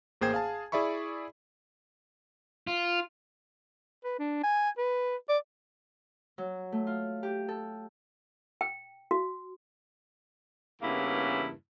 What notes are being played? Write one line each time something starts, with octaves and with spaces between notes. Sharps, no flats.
A1 A#3 G#4 C5 G5 G#6
G#4 F5 G#5 A5
E4 G#4 D5 E5 B5 C#6
F4
B4
D4
G#5
B4
D5
F#3
A3
F4
G4
A4
G5
F#4
E2 G2 C#3 E3 A#3 E4